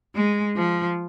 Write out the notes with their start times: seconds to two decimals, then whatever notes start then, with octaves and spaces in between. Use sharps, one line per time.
0.15 G#3
0.56 F3